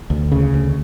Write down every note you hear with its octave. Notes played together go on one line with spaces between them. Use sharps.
D2
C#3
D2